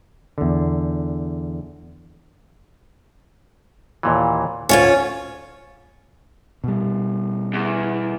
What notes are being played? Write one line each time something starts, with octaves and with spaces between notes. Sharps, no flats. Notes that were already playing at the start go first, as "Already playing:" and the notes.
E2 D3
D#2 A#2 E3
D2 G#2 C#4 F4 C#5
B2 G3
E2